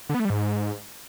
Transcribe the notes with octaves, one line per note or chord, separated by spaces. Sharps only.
D3
B3
A3
G3
G#2